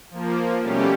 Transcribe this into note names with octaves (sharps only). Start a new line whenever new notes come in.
F3 A#3
B2 G3 A3 C#4 G4